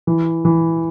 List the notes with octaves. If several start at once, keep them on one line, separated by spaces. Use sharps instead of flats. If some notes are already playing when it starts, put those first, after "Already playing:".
E3
E3